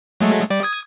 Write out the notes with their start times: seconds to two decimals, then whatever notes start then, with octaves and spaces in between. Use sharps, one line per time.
0.21 F#3 G#3 A3
0.50 G3 D5
0.63 D#6 G#6